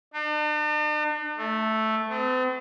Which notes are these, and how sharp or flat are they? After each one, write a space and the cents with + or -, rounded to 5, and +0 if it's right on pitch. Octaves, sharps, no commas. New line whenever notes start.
D4 +45
A3 -5
C4 -45